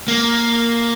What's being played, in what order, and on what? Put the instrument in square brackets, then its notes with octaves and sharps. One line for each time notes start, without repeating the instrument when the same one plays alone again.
[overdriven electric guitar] A#3